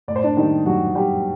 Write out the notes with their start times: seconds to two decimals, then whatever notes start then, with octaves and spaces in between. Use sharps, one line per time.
0.08 A2 D5
0.16 C5
0.23 D4 D5
0.37 D#3 G3 D#4
0.66 F#3 G3 F#4
0.95 G3 G4